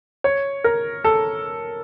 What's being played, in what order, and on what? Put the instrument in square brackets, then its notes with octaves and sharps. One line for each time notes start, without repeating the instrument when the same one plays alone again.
[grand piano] C#5
A#4
A4